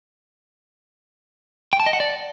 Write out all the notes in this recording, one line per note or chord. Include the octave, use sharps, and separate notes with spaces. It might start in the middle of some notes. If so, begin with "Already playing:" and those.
G5
A5
D#5
F#5
D5